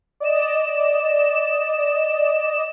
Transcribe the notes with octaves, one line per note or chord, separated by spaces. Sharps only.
D5 D#5 E7